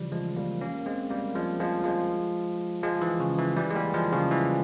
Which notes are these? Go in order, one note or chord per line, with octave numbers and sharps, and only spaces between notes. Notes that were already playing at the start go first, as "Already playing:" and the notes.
Already playing: C#3 E3 F3 G3
F3 G#3
G3 A#3
A#3 C#4
G#3 C4
G3 A#3
F3 G#3
F3 G#3
F3 G#3
F3 G#3
E3
C#3
E3
E3 G3
G#3
G3 A#3
F3 G#3
C#3 F3
E3